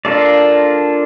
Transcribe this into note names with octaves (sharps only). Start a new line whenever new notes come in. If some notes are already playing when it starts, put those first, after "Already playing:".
A#3 D4 F4 A4 D5